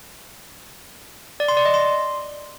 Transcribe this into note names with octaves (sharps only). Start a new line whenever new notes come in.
D5
C6
D5
D#5
C6